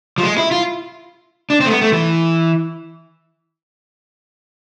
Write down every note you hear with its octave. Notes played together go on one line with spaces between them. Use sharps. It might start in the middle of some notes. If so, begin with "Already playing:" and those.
F3
G#3
E4
F4
D4
C4
A3
B3
A3
E3